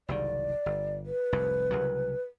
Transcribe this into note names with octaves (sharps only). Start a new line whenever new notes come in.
F#1 C2 D#3 D5
G1
B4
F1 C2 G#2
C2 C#3 F#3